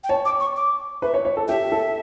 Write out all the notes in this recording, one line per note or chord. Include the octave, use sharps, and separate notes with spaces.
G5
C#5 A5
D6
C#6
D6
B4 E5
C#5
C#5
A4
G4 E5
A4